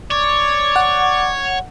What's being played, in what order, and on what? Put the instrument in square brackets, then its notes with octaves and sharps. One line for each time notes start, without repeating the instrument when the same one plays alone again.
[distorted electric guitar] C#5 [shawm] D5
[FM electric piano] F#5